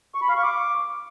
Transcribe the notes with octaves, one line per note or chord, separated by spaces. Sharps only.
C#6
B5
F5
C#6
D6